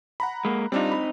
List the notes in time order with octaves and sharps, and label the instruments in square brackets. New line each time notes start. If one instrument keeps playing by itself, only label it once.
[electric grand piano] F#5 A#5 B5
[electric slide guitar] G#3 A#3
[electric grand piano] G3 D4 F4 [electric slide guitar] C4 D#4
[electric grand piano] B5